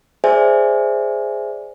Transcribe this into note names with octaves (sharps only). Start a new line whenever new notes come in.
G#4 C5 D5 E5 G#5